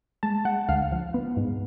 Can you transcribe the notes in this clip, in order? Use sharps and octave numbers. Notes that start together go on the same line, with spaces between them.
G#3 A5
G#3 F#5
D2 F5
F3
B3
G#2